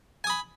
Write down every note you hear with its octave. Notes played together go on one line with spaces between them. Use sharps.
G#5 B5 D#6